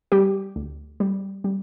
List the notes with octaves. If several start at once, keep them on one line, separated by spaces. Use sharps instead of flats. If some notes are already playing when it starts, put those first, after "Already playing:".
G3 G4
D2
G3
G3